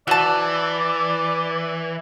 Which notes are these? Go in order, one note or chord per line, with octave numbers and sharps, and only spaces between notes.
E3 F#4 D5 A5